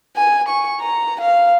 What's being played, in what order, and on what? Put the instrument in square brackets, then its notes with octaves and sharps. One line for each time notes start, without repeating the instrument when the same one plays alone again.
[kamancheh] G#5
C#6
A#5
F5